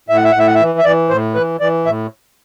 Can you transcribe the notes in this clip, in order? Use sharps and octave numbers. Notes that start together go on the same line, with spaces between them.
A2 E5
F#5
E5
F#5
A2 E5
F#5
E5
E3
E5
E3 D5
A2 C5
E3 B4
E3 D5
A2 E5